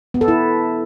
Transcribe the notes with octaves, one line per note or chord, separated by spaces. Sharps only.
B3
A4
E4